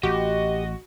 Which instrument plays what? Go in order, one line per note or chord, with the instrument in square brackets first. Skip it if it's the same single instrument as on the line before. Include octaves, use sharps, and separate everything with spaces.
[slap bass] A1 [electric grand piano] F#4 [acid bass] G4 [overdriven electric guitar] D#5